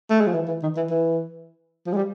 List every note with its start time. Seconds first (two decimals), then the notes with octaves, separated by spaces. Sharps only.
0.10 A3
0.20 G#3
0.27 F3
0.34 E3
0.48 E3
0.63 D#3
0.77 E3
0.90 E3
1.87 F3
1.93 G#3
1.97 G3